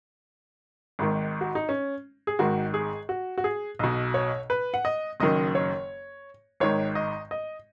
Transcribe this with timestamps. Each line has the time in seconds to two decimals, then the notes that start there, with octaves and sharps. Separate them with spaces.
0.99 G#1 G#2 D#3
1.41 F#4
1.55 D#4
1.69 C#4
2.27 G#4
2.39 G#1 G#2 D#3 F#4
2.74 G#4
3.09 F#4
3.38 F#4
3.44 G#4
3.79 B1 B2 D#5
4.14 C#5
4.50 B4
4.74 F#5
4.85 D#5
5.20 F#1 F#2 D#3 D#5
5.55 C#5
6.60 G#1 G#2 D#3 C#5
6.95 D#5
7.31 D#5